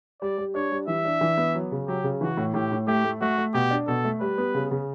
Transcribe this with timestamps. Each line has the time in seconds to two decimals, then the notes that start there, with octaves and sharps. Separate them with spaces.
0.21 G3 D5
0.38 G3
0.55 D4 C#5
0.72 G3
0.87 E3 E5
1.05 D4
1.21 E3
1.38 B3
1.55 F#3
1.72 C#3
1.87 F#3 G4
2.04 C#3
2.21 E3 F#4
2.37 A2
2.54 A2 G4
2.72 A2
2.87 A3 G4
3.04 A3
3.21 A3 F#4
3.38 A3
3.54 B2 G4
3.71 D4
3.87 B2 A4
4.05 A3
4.20 G3 B4
4.38 B3
4.54 C#3
4.71 C#3